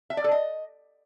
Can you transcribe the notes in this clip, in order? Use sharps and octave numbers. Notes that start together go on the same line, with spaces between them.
E5
D5
A4
D#5